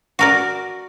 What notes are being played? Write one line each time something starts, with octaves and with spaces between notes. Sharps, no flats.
F#4 A#4 D5